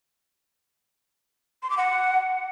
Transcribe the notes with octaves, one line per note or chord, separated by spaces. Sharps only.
C6
D6
F#5